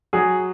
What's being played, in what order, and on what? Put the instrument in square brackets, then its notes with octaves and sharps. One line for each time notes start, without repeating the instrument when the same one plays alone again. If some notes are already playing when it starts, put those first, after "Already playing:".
[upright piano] F#3 G#4